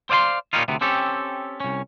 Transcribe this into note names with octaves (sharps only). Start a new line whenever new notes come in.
C5 D5 F5 G#5 C6
A#2 C#3 G3 C#4 D#4 F4
D2 C3 B3
C4 C#4 G4 A4
C2 C#4